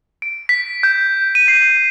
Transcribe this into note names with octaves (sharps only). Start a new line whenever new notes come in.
D7
B6
G6
D#7
C7